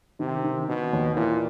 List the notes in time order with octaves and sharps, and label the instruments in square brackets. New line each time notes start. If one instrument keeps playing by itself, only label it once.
[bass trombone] C3 [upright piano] D#3
[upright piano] D#3
[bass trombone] B2 [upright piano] D#3
[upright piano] D#2
[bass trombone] A#2 [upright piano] E3